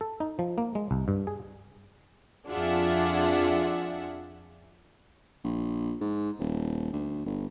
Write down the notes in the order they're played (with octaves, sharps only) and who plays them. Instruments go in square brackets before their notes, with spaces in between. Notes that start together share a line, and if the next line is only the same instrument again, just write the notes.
[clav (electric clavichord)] A4
D#4
F3
A#3
G#3
C2
G2
G#4
[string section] F2 D4 F4 G#4 E5 F#5
[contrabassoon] A#1
G#2
D#1
D2
G1